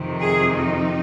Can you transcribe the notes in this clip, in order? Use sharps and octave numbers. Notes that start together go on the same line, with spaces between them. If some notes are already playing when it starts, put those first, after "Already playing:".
Already playing: F2 C3 D#3
G#4
D#4